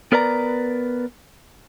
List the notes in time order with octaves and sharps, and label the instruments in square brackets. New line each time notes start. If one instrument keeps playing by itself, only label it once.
[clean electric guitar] B3 A#4 B4 D5 A#5